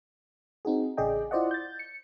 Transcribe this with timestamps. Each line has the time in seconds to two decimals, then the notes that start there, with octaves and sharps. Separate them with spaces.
0.65 C4 D#4 F#4 G#4
0.97 A1 C#3 G#4 D5 D#5 G5
1.31 E4 F4 C5 D5 D#5 F#5
1.51 G6 A6
1.79 C#7